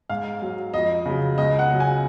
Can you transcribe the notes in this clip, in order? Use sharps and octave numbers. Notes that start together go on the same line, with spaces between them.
G#2 F5
F#3
F2 D#5
C#3 F#3
C#2 D#5
F#5
C#3 F#3
G#5